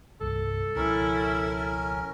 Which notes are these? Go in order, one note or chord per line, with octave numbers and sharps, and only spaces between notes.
C2 G2 A#2 A4
C#2 B2 F3 C#4 E4 A#4